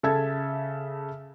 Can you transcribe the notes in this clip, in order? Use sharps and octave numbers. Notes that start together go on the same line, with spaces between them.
C#3 A4 E5 A5 G#6